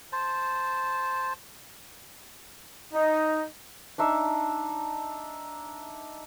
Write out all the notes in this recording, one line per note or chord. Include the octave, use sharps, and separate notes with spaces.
C5 A5
D#4 D#5
D4 D#4 E5